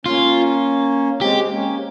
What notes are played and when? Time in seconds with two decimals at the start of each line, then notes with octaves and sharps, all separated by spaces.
0.05 A#3 C#4 F4
1.21 G#3 C4 G4
1.40 C4
1.50 A#3 C#4